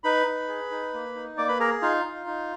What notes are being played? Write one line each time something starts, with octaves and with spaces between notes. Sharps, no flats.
D#4 B4 B5
D#4
G#4
D#4
A#3
D#4
A#3 D5 D6
B4 B5
G#4 A#4 A#5
D#4 F4 F5
D#4
D#4